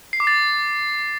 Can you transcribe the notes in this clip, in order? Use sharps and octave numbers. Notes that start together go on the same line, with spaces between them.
C7
D6
A6